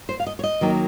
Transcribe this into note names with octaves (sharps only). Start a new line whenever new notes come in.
C5
F5
D#5
C#5
D#5
D#3 F#3 A#3